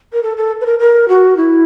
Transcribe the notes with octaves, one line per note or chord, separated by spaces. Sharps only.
A#4
A4
A4
B4
A#4
A#4
F#4
E4